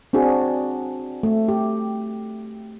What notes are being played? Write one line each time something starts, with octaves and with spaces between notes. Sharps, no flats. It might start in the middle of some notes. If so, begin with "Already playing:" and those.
C4 D4 F#4 G#4
A3
G4